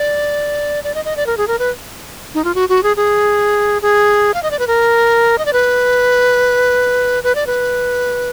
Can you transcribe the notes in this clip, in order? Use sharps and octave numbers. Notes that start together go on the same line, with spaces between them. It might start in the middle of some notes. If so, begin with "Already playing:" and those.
Already playing: D5
D5
D#5
D#5
D5
A#4
G#4
A#4
B4
D#4
F4
F#4
F#4
G#4
G#4
G#4
F5
D#5
D5
B4
A#4
D#5
D5
B4
B4
D5
B4